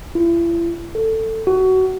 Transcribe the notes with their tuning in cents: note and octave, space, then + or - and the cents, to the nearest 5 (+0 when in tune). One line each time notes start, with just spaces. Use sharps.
E4 +40
A4 +15
F#4 +20